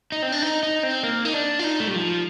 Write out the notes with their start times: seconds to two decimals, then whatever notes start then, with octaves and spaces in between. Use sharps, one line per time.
0.12 D#4
0.22 C4
0.32 D4
0.42 D#4
0.63 D#4
0.83 C4
1.03 A#3
1.25 D#4
1.34 D4
1.59 F4
1.64 D#4
1.80 A3
1.88 G3
1.95 F3